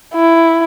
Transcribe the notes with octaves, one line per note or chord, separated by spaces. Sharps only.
E4